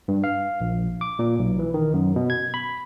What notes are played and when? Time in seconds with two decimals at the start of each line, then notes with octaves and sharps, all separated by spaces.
0.08 G2
0.24 F5
0.61 A#1
1.01 D6
1.19 A#2
1.39 B1
1.59 E3
1.74 D#3
1.94 F#2
2.16 B2
2.30 G#6
2.54 B5